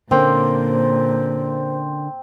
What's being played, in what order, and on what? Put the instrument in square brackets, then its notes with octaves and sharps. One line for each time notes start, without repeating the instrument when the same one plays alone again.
[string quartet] A#2 [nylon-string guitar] D3 A#3 C#4 [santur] C4 [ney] C5